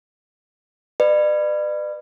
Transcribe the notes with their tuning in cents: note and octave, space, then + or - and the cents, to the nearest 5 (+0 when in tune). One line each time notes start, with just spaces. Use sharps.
B4 +10 D5 +40